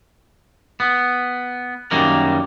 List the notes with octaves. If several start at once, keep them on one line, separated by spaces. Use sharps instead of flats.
B3
F#2 D#3 G3 A#3 A#4